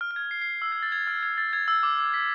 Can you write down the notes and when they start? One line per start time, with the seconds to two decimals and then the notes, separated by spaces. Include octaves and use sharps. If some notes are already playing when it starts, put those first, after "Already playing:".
0.01 F6
0.11 F6
0.16 G#6
0.31 C7
0.42 C7
0.62 E6
0.72 G#6
0.82 A6
0.92 G#6
1.07 F6
1.23 G#6
1.38 A6
1.53 G#6
1.68 E6
1.83 D6
1.98 E6
2.14 B6